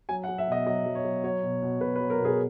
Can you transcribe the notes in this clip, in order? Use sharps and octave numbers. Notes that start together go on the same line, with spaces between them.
F#3 G#5
F#5
F#3
E5
B2 D#5
F#3 D#5
F#3
C#5
F#3
F#3 C#5
B2
B2
B2 B4
B4
F#3
A#4
B2
G#4